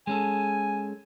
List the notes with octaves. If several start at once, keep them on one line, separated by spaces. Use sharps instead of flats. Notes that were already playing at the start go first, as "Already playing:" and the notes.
G#3 C#4 A4 G#5